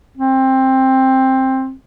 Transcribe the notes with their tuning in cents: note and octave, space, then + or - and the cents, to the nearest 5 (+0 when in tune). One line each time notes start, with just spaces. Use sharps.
C4 +15